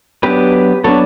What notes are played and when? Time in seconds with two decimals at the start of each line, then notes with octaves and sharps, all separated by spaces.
0.23 F#3 B3 D4 G4 B4
0.84 F#3 B3 D4 A4 C#5